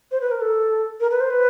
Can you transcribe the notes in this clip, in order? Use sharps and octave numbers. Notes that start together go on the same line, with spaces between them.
C5
B4
A#4
A4
A#4
B4
C5
B4